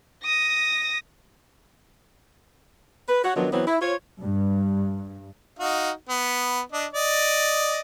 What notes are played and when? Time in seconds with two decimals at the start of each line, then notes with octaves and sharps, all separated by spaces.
0.24 D#6 A#6
3.09 B4
3.24 F#4 C#5
3.36 D#3 F3 F#3 B3 D4
3.52 E3 F#3 B3 C4
3.67 E4
3.81 F4 C5 C#5
4.20 G2
5.59 D#4 F#4 F5
6.09 B3
6.72 D4 D#5
6.93 D5 D#5